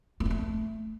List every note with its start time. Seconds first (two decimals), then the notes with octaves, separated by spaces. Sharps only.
0.20 A3
0.25 C4
0.30 A3